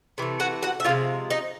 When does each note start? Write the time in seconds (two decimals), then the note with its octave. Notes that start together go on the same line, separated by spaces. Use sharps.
0.18 C3 E3 A3
0.40 F#4 F#5
0.63 F#4 F#5
0.80 E5
0.85 C3 F3 G#3 F4 F5
1.30 D#4 D#5